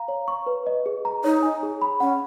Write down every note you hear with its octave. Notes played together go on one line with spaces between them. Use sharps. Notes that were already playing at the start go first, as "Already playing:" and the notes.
Already playing: F5 A#5
C#5
C#6
B4
D#5
G#4
A#5
D#4 C#5
G#5
G#4
B5
C#4 F#5